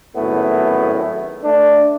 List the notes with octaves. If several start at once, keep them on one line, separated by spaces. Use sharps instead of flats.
G#1 F#2 A2 B3
A3 D4